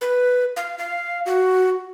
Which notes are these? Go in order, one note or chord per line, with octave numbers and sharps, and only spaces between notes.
B4
F5
F5
F#4